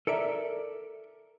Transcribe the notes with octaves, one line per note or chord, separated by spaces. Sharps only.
A4 A#4 D5 E5